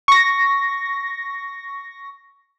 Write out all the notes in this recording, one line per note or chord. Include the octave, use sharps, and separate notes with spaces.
C#6 A#6